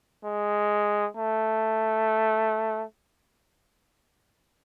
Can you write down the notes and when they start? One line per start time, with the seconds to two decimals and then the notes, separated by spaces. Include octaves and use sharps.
0.24 G#3
1.17 A3